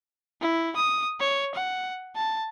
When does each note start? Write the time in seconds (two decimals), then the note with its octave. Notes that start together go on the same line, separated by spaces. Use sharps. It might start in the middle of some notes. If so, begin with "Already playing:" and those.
0.41 E4
0.76 D#6
1.20 C#5
1.55 F#5
2.15 A5